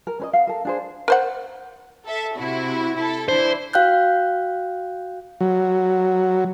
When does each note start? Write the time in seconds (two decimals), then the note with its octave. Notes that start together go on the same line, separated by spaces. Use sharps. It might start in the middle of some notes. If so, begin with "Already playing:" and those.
0.07 A#4
0.20 C#4 B4 D#5
0.33 F5 F#5
0.47 A4 A#4
0.65 D4 G#4 C5
1.08 A#4 C5 F#5
2.06 A4 E5
2.37 C3 E4 F#4
2.96 E4 A4
3.28 E3 D4 E4 C5
3.73 F#4 F5 G5 F#6 G6
5.41 F#3